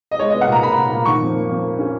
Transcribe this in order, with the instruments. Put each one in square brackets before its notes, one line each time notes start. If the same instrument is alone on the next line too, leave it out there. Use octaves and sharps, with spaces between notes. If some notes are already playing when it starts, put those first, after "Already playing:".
[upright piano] D#5
G#3 C#5
D#5
B3
F#5
A#2 A#5
A#2 B5
A#2
A#2
D#3 C#6
F2
A#3
F2
A#3
C#4